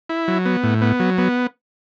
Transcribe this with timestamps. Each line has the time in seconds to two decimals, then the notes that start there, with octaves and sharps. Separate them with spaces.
0.09 E4
0.28 F#3
0.46 B3
0.63 A2
0.81 B3
1.00 F#3
1.18 B3